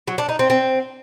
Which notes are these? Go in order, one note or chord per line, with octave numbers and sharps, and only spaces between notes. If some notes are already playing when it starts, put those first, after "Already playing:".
F#3
D4
D#4
C4
C4